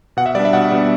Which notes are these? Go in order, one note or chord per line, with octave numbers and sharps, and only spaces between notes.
B2 F#5
E5
G3 B3 D4 D5
E5
B2 F#5
G3 B3 D4